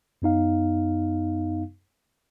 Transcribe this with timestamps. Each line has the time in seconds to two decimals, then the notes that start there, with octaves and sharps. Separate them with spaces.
0.22 F#2 B3 D#4 F5